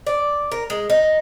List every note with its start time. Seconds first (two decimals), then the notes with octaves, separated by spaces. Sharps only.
0.07 D5
0.52 A#4
0.70 G#3
0.90 D#4